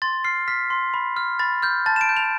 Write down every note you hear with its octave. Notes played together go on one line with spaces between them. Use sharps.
C6 A6
F6 C7
F6 B6
C6
B5
F6
B5 A6
F6 G6
A5 A6
E7
D7
G6
F7